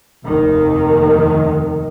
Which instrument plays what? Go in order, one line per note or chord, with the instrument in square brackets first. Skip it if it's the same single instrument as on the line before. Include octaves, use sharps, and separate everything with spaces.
[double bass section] F1 D#2 D#3